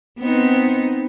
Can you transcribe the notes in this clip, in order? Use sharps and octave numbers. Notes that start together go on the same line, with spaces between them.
B3 C4 D#4